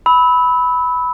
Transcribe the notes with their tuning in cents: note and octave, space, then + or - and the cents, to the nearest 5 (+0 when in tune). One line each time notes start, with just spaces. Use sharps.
B5 +5 E6 -30